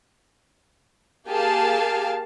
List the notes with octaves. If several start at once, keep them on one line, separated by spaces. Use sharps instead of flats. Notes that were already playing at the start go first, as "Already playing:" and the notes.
A#3 G4 G#4 F5 A5